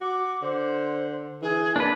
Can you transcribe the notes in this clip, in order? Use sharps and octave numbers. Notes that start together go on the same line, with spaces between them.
F#4 D6
D3 C5
E3 G#4
A#3 D4 B4 D5